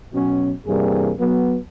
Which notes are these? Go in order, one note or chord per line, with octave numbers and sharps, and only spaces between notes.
B2 F#3 C#4
G2 C3 E3 G3 A#3 G#4
F#3 B3